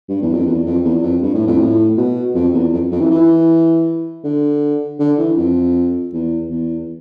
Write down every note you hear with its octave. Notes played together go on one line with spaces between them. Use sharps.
G2
E2
F2
E2
F2
E2
F2
G2
A2
F2
A2
B2
F2
E2
F2
F2
E3
E3
D3
D3
E3
F2
E2
E2